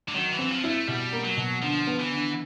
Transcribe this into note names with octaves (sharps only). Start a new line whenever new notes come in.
D3
D#3 F#3
E3
C4
F3
E4
A3
B2 G3
A#3
F#3
B2
D3 F3
B3
E3
D3